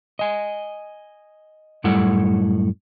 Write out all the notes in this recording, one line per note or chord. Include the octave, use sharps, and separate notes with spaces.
D#5 G#5
F#2 A2 G3 E4 A4 F#5